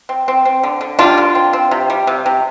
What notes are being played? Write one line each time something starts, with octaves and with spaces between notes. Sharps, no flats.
C4
C4
C4
D3
D3
G3 D4 F4
D3
C4
C4
C3
G3
C3
C3